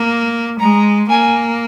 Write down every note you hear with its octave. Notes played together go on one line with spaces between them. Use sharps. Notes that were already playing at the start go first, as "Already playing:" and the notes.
Already playing: A#3
G#3 A#5
A#3 G#5